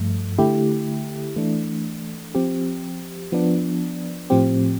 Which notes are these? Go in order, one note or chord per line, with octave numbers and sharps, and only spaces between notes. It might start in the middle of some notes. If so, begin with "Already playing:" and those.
Already playing: G2 F3 A3
D3 A3 E4 G4
E3 A3 D4
F3 C4 G4
F3 B3 D4
A2 F3 C4 G4